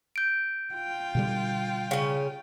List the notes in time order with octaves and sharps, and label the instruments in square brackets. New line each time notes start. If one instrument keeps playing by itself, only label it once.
[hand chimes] G6 D7
[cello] F4 G5
[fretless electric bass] B2 D3 G3
[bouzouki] C#3 C#4